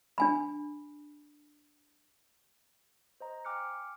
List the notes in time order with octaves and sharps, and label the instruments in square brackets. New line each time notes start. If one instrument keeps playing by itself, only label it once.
[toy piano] D4 G#5 B5
[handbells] C5 D#5 A#5
G5 G#5 D6 F6 F#6 C#7